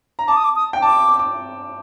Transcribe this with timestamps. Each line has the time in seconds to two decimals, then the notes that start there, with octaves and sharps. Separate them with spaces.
0.19 A#5
0.28 A5 D6
0.37 D#6
0.44 D6
0.56 D#6
0.73 G5
0.82 A5 D6
1.19 D6